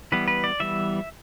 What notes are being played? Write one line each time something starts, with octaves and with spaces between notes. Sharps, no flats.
E3 G3 B3 B4
B4
D5
E3 G3 B3 E5